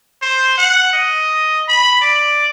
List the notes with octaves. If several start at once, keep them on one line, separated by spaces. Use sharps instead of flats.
C5
F#5
D#5
B5
D5